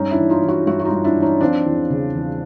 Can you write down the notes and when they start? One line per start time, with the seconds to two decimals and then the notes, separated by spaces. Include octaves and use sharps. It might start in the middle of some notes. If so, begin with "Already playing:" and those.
Already playing: G2 C#4 D#4
0.11 D4 E4
0.18 E3
0.30 D#4 F4
0.43 E3
0.48 E4 F#4
0.67 G2 E4 F#4
0.79 F#4
0.85 D#4 F4
0.91 G2
1.04 D4 E4
1.16 E3
1.22 C#4 D#4
1.41 F3 C4 D4
1.66 E2
1.90 C#3
2.15 E2